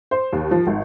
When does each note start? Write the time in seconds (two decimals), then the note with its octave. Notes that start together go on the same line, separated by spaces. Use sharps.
0.11 C5
0.33 D#2
0.51 F3
0.67 G#1